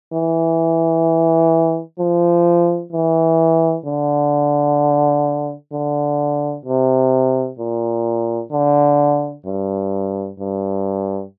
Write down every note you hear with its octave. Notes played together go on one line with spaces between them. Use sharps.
E3
F3
E3
D3
D3
C3
A#2
D3
G2
G2